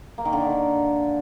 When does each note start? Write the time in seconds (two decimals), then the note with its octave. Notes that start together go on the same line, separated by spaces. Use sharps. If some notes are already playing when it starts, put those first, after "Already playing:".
0.18 A#3
0.25 D#3
0.33 D3